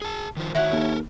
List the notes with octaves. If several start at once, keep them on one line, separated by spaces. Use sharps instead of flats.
G#4 A5
D#3 F3 C5
D#3 E4 F#4 C#5 F#5
D#2 A4 A#4